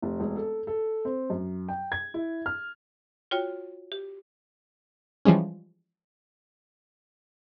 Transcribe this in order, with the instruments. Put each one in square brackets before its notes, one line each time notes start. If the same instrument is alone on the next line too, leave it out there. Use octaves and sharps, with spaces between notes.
[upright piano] F1
E1
A4
A4
C4
F#2
G5
G#6
E4
F6
[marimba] F4 F#4 C#5 G5 F6
G4
[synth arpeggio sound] E3 F3 G3 G#3 C#4